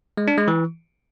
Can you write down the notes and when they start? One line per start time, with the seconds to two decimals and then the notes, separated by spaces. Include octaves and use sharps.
0.17 G#3
0.28 D4
0.38 G#3
0.48 E3